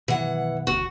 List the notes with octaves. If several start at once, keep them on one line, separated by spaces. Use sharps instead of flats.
B2 D#3 E3 F#3 F#5
E1 D2 F#4